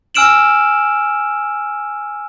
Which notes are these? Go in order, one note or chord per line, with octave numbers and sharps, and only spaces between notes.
G#5 E6 F6 D7 E7 F#7